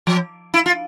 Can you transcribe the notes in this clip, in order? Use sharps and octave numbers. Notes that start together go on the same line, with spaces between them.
F3
E4
F4